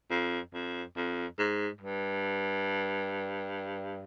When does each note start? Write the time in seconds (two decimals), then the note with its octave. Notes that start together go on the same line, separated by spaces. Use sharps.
0.10 F2
0.53 F2
0.96 F2
1.39 G#2
1.81 G2